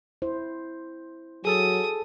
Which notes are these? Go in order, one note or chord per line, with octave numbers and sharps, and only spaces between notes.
E4 C5
F#3 G#4 A4 A5 D#6